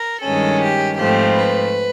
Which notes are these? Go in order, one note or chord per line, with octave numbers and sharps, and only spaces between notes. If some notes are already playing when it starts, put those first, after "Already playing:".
Already playing: A#4
G2 D#3 G#3 C#4 A4
G4
G#2 F3 A3 C4 G4
B4